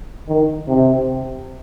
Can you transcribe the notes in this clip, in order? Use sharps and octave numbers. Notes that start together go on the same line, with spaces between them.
D#3
C3